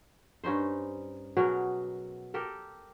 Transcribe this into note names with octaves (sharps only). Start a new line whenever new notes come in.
G2 C#4 D#4 C5
B2 F#3 G#4 A#4
G4 A4 A#4